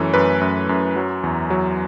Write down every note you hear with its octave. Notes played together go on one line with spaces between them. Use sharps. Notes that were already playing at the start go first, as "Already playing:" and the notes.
Already playing: F#2 E3 A3 C#5
F#2 B4
F#2
F#2
F#3
E2
F#3